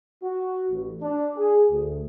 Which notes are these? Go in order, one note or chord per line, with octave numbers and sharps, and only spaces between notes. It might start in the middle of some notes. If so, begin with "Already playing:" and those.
F#4
A1
D4
G#4
D2